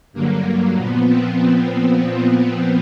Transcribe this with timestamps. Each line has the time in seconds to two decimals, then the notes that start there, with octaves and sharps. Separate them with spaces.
0.13 G2 D3 F#3 A#3
0.75 A#2 F3 B3
1.07 C4